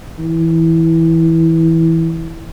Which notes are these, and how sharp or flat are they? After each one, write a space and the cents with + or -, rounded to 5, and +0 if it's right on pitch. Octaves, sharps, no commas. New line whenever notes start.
E3 -10